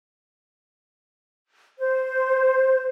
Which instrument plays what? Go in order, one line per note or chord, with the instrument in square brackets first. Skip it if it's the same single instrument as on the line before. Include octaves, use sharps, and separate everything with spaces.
[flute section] C5